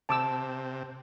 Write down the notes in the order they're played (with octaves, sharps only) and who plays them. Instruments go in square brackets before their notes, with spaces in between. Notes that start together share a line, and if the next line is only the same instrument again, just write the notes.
[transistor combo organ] C3 [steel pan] A5 D6 E6